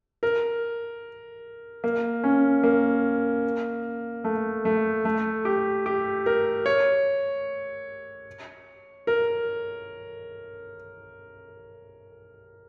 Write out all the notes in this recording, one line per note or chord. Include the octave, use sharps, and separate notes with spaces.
A#4
A#3
C#4
A#3
A3
A3
A3
G4
G4
A#4
C#5
A#4